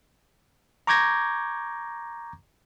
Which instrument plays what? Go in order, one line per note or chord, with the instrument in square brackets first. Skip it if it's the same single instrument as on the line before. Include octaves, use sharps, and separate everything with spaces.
[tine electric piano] A#5 C#6 D6 G6 G#6 A#6